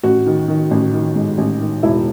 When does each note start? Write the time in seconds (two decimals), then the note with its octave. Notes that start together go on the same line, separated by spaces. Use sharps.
0.03 A1 F#4
0.26 D#3
0.48 D#3
0.71 A1
0.93 D#3
1.16 G#2
1.38 A1
1.61 D#3
1.83 E1 E4